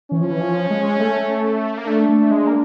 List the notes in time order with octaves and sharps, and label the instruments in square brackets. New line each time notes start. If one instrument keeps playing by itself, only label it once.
[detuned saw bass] E3 [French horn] C#4
[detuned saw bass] F3
E3
F3
G#3
A3
A#3
[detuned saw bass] A3 [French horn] D4
[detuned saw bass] A3
G#3
A#3